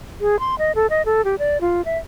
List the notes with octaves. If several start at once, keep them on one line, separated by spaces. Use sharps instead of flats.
G#4
C6
D#5
A4
D#5
A4
G4
D5
F4
E5